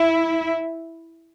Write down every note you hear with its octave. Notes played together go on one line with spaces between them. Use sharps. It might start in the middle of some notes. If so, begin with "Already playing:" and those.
Already playing: E4